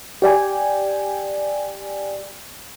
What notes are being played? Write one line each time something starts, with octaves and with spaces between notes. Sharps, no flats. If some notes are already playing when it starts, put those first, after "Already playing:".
G4 D5 G5 G#5